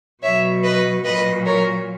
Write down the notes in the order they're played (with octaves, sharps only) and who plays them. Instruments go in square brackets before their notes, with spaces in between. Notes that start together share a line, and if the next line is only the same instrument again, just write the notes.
[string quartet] B2 F#3 C#5 E5
B4 D#5
A#2 F#3 B4 D#5
A#4 C#5